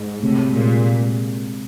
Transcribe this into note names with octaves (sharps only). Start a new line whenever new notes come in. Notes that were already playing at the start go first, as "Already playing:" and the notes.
Already playing: G#2 G#3
A2 C3
A#2 G#3
G#3